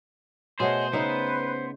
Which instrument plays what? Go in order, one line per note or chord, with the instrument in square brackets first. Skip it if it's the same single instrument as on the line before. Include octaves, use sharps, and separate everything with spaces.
[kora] B2 A3 [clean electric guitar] G#4 [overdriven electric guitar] C5 [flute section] C#5 D#5 F#5
[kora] C#3 D#4 E5 [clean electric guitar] B3 [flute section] B4